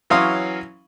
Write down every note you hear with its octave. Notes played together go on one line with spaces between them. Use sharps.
E3 F#3 C#4 F5 C6 D#6